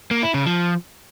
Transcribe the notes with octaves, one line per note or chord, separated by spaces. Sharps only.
A#3
E4
C#3
F3